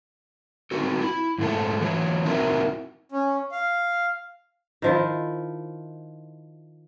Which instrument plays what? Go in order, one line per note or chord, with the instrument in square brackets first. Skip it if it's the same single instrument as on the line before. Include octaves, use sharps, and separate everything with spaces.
[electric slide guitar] C4 D#4 F#4 A4
E4
F2 G#2 F3 A3 A4
E3 F#3 C#5
C4 D#4 E4 F#4 A#4 E5
[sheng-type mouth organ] C#4
F5
[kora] D#3 F3 E4